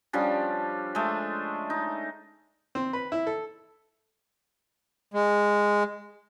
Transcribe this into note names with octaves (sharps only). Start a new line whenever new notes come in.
F3 G3 C#4 D4
G#3 A3
D#4
C4
B4
E4
A4
G#3